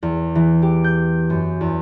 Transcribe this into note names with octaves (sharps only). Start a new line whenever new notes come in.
E2
E3
G4
G6
F#2
E2